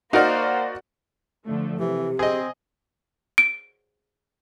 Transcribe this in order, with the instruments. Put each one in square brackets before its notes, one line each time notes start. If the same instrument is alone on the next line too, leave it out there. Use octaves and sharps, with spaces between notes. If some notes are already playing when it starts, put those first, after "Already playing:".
[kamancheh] A#3 C5 [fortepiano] D#4 A#4 [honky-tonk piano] F#4 D5
[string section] D3 F3 A3
[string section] C3 [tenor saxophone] E3 [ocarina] G4
[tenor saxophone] C4 [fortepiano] G#4 D#5
[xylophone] D7